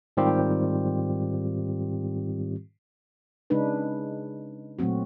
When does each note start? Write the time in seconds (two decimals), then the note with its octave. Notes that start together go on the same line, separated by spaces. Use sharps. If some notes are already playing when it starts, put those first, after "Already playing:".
0.17 G#2 D#3 G3 C4 F4 G4
3.50 C#3 G#3 D4 D#4 B4
4.79 A#2 F#3 A3 C4 F#4